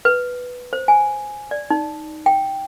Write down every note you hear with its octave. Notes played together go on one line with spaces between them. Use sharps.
B4
C5
G#5
D5
D#4
G5